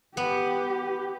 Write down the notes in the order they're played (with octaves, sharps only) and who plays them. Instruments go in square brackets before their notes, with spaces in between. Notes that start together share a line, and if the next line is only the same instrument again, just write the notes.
[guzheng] B3 [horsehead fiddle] G4